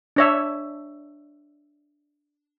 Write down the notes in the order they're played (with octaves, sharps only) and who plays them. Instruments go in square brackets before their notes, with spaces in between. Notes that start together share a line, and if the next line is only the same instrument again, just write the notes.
[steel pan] D4 C#5 E5